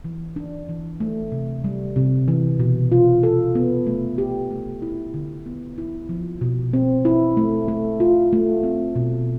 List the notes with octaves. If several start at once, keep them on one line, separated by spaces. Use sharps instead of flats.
E3
D4
E3
A3
C3
G3
C3
E3
B2
F4
A4
B3
A3
G4
A3
E4
D3
B3
E4
F3
B2
C4
E4
A3
A3
F4
A3
C4
B2